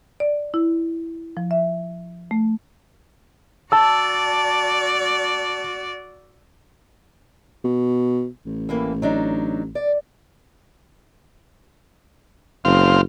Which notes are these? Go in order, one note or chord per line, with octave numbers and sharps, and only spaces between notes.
D5
E4
F3
E5
A3
F#4 D5 A5 E6
B2
A1
A2 E3 A#3
F#3 D4 D#4
D5
F#1 C4 F5